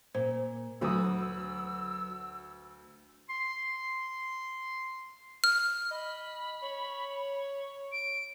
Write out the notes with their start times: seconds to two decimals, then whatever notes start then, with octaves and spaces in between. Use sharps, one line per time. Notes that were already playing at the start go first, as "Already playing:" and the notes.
0.15 A#2 C5
0.81 D2 F#3 F#4 B4 D#6 E6
3.30 C6
5.44 F6
5.91 D#5 B5
6.63 C#5
7.92 D7